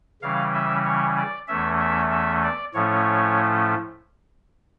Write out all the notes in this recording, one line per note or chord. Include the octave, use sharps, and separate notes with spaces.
C#3 E3 G3 C#4 F5
E5
C#5
D5
E2 E3 A3 C#4 E5
E5
E5
D5
A2 F3 A3 C#4 C#5